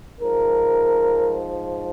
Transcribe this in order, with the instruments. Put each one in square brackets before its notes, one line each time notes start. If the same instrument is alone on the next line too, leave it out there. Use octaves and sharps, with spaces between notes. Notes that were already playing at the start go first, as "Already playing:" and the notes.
[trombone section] G#2 F3 A#4